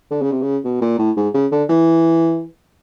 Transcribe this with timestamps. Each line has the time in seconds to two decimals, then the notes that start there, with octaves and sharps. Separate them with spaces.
0.11 D3
0.22 C#3
0.32 C3
0.42 C#3
0.65 B2
0.81 A#2
0.99 A2
1.17 G#2
1.34 C#3
1.52 D3
1.69 E3